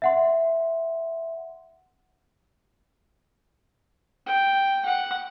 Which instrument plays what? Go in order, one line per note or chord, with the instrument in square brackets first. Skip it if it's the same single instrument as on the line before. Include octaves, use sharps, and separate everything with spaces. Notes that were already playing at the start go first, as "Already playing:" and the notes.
[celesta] E5 F#5 C6
[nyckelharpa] G5
F#5